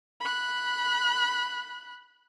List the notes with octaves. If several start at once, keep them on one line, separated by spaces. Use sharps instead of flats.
B5 F#6